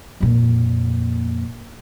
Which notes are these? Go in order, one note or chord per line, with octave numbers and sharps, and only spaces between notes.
F2 A#2